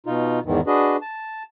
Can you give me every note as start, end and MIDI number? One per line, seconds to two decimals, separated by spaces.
0.06 0.40 47
0.06 0.40 63
0.06 0.40 65
0.45 0.61 40
0.45 0.61 44
0.45 0.61 51
0.45 0.61 52
0.67 0.97 62
0.67 0.97 66
0.67 0.97 68
0.67 0.97 71
0.67 0.97 75
1.02 1.43 81